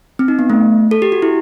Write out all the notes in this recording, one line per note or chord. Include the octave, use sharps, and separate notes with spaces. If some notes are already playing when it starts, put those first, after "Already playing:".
C4
D#4
B3
A3
A4
G4
F#4
E4